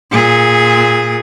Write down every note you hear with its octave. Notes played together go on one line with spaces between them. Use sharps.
A#2 G#4